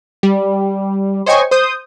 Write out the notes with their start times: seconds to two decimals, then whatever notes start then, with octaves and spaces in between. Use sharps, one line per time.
0.23 G3
1.26 C5 C#5 D#5 G5 G#5 C#6
1.51 C5 D#6 G6